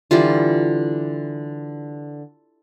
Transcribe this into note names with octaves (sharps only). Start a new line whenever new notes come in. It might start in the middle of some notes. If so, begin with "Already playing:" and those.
D3 E3 G3 F4